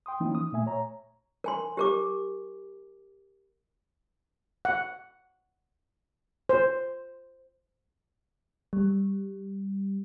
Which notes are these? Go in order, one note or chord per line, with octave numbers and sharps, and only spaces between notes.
G5 C6 D#6
E3 F3 A#3 C#4 D#4 E4
D#6
A#2 A3 E5 G#5
C#5 A#5
A#4 G#5 C6
G4 A#4 D6
F#5
C5
G3